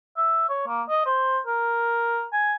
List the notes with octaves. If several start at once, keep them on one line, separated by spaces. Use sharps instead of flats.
E5
C#5
A#3
D#5
C5
A#4
G#5